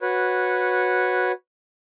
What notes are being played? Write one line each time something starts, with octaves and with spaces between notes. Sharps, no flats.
F#4 B4 C#5